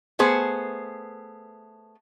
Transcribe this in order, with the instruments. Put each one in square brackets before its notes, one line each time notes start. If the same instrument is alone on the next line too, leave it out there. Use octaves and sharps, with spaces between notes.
[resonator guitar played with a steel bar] A3 B3 G#4 C5